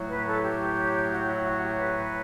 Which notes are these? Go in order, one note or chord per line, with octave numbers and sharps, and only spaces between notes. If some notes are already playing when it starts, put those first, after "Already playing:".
Already playing: A2 F#3 A3
B4
A4
G4
F#4
E4
F#4
G4
B4